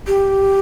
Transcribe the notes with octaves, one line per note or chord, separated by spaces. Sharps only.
G4